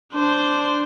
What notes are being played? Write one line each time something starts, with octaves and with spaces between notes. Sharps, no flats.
D4 C5